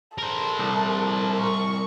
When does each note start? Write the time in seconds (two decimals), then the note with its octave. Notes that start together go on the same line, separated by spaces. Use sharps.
0.18 A4 A#4 C5
0.59 C2
1.40 C#6